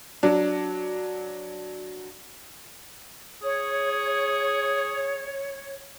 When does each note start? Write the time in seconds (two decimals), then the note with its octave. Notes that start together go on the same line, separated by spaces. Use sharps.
0.23 F#3 D4
3.43 G#4 C#5